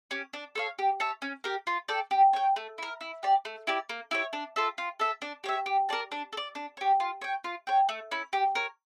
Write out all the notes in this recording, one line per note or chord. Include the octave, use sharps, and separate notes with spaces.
C#4 G4
D4
A4 C#5 F5
G4
C#5 E5 A5
C#4
G4 A#4
F4
A4 D5 G5
G4
C#5 G5
A3
E4 A#4
E4
G4 D5
A3
E4 G4 D5
A#3
E4 G4 C#5
D4
F4 A4 E5
F4
A4 E5
D4
G4 C#5 E5
G4
A#4 D5 A5
D4
A4
D5
D4
G4 C#5
F4
C#5 G5
F4
C#5 G5
A3
C#4 E4
G4
A#4 C#5